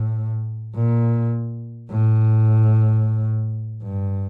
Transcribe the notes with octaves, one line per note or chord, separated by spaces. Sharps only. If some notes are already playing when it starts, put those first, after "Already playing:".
Already playing: A2
A#2
A2
G2